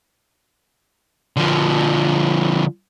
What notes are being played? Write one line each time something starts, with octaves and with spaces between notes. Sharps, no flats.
D3 F3